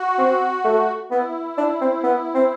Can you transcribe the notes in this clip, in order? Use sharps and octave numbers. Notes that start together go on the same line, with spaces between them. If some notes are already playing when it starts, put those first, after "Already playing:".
Already playing: F#4
C4
A3
B3 E4
D4
C4
B3
C4